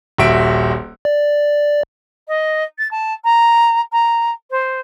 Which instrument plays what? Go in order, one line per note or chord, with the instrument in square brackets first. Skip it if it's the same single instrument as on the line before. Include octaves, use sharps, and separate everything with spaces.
[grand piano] D#1 A#1 F#4 E5 D7
[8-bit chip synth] D5
[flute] D#5
A6
A5
A#5
A#5
C5